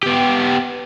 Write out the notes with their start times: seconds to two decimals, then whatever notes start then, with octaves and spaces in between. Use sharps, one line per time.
0.03 B3 G4